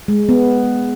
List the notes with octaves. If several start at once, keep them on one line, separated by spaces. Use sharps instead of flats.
G#3
B3